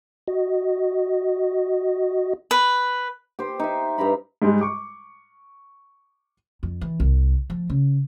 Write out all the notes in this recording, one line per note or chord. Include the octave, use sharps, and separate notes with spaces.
F#4 D#5
B4
G4 C5
D#4 E5
G2 G4 A#5 B5
G#2 G3 G#3
C#6 D6
F2
E3
C2
F3
C#3